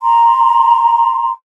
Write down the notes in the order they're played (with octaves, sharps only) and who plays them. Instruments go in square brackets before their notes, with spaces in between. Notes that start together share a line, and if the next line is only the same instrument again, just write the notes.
[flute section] A#5 C6